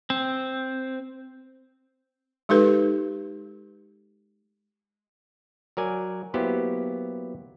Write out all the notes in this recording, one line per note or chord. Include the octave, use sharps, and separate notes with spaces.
C4
G#3 D#4 G4 A4 B4
F#3 A#4 D5 G#5
F#3 A#3 B3 E4 G4 C5